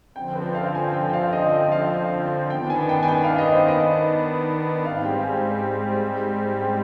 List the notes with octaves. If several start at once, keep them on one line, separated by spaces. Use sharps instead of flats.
D3 F3 C4 G5
B4
F5
G#5
G5
G5
F5
D#5
D#5
F5
D#3 B3 D4 G5
G#5
G5
G#5
G5
F5
D#5
C5
D#5
G#2 G3 C4 F5
G5
G#5
G5